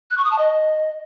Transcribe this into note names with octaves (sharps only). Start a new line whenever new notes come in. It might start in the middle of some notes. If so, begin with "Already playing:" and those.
F#6
C#6
D#6
A5
D#5